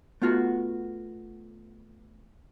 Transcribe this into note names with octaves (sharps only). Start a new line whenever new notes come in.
A3 B3 F4 F#4